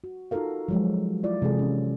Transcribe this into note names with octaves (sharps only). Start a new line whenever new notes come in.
F#4
D#4 F4 F#4 A4 A#4 F5
F3 F#3 G#3
E4 F4 D5
C3 E3 G#3 G#4 A4
C#4